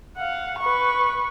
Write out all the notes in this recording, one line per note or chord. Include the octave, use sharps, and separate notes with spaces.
F5 F#5
B4 C#6